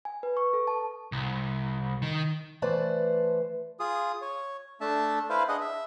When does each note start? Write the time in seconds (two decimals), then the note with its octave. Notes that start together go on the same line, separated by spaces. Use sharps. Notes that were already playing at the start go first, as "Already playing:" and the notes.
0.05 G#5
0.23 B4
0.37 C#6
0.53 A4
0.68 A5
1.12 C2
2.02 D#3
2.62 E3 A3 B4 C5 D5 A5
3.80 F4 G#4 D#6
4.21 C#5
4.81 A3 D4 E5 A5
5.30 E4 B4 C5 F5
5.48 D4 G#4 D#5 F#5
5.60 E5